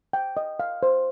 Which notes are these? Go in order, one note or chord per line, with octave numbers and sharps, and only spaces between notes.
G5
D#5
F5
C5